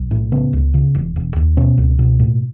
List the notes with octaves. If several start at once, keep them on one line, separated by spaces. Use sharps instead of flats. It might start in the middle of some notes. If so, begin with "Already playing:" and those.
Already playing: B1
A2
C#3 B3
C#2
C#3
E1
E1
D#2
B2 C#4
C#2
B2
A2